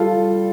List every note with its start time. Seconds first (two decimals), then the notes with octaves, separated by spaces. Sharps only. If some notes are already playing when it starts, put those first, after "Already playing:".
Already playing: G3 F4 A4